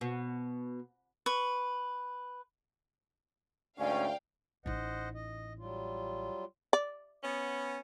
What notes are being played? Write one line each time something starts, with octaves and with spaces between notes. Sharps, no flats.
B2
B4 C#6
D2 G#2 C#4 D5 F5 G5
A1 D#4 C5 D#5 F#5
D#5
F#3 G3 F4
D5
B3 C#4